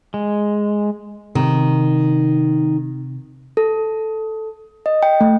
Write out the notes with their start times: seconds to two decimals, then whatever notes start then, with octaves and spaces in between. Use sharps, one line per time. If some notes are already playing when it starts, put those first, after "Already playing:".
0.14 G#3
1.35 C3 D#3
3.57 A4
4.86 D#5
5.03 G5
5.21 A3